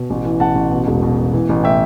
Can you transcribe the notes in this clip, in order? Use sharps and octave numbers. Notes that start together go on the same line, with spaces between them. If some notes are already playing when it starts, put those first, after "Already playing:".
Already playing: B2
A1
E3
A1 F#5 A5
A1
B2
E1
B2
B2
E3
A1
A2 E5 G5